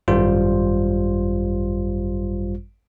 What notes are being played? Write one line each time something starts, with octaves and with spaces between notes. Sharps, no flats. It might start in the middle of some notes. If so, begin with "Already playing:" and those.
G#1 F#2 G3 F4 C5